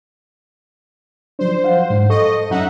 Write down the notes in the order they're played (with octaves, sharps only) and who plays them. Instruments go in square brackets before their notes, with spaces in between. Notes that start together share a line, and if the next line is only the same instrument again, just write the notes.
[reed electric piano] F3 F#3 D4 [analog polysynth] C5
[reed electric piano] F5 F#5
G#2
[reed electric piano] A4 C#6 [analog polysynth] D#5
[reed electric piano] F#2 F#3 C#4 [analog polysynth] D#4 E5 F#5